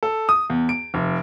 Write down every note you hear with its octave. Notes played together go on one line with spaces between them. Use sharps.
A4
D#6
E2
D7
F1